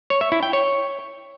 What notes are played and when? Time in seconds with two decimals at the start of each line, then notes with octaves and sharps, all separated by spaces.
0.10 C#5
0.21 E5
0.32 E4
0.43 G5
0.53 C#5